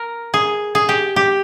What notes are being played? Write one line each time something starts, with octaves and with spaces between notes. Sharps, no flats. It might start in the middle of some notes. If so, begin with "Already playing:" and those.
Already playing: A#4
G#4
G#4
G4
G4